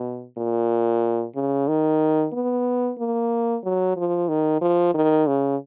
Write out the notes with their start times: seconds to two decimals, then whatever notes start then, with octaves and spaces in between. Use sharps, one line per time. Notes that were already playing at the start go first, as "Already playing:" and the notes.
Already playing: B2
0.37 A#2
1.35 C#3
1.68 D#3
2.33 B3
2.98 A#3
3.64 F#3
3.97 F3
4.29 D#3
4.61 F3
4.94 D#3
5.27 C#3